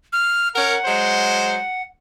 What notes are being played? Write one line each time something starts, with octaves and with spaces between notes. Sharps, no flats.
F6
C#4 A#4 F#5
F#3 G#3 C5